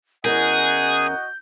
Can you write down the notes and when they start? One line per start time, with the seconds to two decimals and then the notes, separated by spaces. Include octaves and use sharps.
0.25 E2 C#4 F#4 G#4 A#4 D#5 F#5 G6